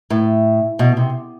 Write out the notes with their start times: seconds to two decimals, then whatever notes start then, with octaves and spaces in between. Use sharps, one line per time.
0.10 A2
0.79 B2
0.97 C3